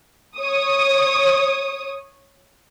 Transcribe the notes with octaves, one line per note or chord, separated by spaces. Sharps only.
C#5 D#6